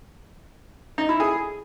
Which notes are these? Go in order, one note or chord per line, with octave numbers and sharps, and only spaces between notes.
D#4
E4
G#4